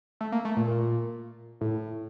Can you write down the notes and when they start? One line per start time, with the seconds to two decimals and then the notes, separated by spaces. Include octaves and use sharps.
0.21 A3
0.32 A#3
0.45 A3
0.57 A#2
0.68 A#2
1.61 A2